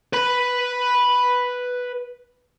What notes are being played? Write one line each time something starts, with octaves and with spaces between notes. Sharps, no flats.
B4 B5